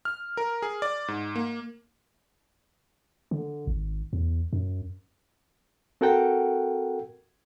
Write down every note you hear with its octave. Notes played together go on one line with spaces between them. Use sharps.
F6
A#4
G#4
D5
G#2
A#3
D3
G#1
E2
F#2
C4 F#4 A4 A#4 F#5 G5